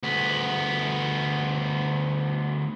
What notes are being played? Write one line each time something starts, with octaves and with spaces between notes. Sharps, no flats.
D2 B3